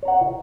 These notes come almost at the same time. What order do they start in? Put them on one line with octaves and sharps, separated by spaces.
C#5 A#5 F#5